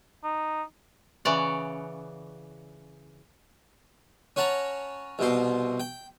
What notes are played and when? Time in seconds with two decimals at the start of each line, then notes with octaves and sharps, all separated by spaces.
0.24 D#4
1.25 C#3 E3 C#5 D5 F#5
4.36 C#4 C#5 F#5 A5 A#5
5.19 C2 B2 C5
5.80 G5